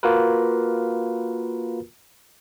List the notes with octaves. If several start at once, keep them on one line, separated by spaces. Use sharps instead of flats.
A#3 F4 F#4 A#4 B4